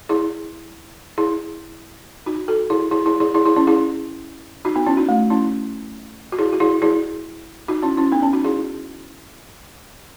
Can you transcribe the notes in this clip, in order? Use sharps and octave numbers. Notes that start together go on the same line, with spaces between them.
E4 G#4
E4 G#4
D#4 F#4
F#4 A4
E4 G#4
E4 G#4
E4 G#4
E4 G#4
E4 G#4
E4 G#4
C#4 E4
E4 G#4
D#4 F#4
B3 D#4
C#4 E4
D#4 F#4
A3
C#4 E4
F#4
E4 G#4
F#4
E4 G#4
E4 G#4
D#4 F#4
C#4 E4
C#4 E4
B3 D#4
C#4
D#4 F#4
E4 G#4